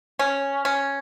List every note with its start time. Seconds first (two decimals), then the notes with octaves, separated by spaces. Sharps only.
0.19 C#4
0.65 C#4